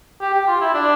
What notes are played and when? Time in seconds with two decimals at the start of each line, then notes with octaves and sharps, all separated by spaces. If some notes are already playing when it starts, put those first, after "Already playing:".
0.21 G4
0.34 G4
0.47 F4
0.61 E4
0.74 D4